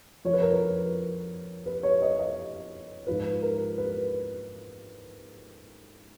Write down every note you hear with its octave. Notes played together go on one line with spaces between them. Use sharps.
F2 F3 C#5
B4
A#4
B4
B4
C#5
D#5
D#5
G#2 F3 B4
A#4
B4